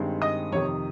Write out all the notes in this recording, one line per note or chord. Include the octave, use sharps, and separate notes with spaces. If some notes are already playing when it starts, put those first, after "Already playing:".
Already playing: G2 D#3 G#3 C4
D#5 D#6
F2 C3 D#3 C#5 C#6